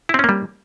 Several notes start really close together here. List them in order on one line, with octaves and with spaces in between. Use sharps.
E4 C4 C#4 A#3 G3